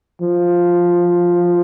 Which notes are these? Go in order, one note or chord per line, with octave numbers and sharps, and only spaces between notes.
F3